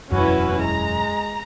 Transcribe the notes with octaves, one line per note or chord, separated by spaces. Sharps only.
E1 F#2 C#4 E4 F#4 B4
G#3 A#5